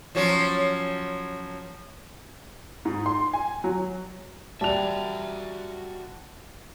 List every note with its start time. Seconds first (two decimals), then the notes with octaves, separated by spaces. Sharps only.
0.15 F3 F#3 C#4
2.85 G#2
3.06 C6
3.33 G#5
3.64 F#3
4.61 G3 F#4 D5 E5 A5 F7